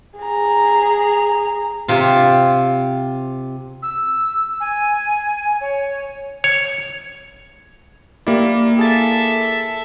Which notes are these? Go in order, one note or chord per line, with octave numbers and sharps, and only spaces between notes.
G#4 A#5
C3 F4
E6
G#5
C#5
C#5
A#3 E4 G4 D5
G#4 A4 E5 A5 A6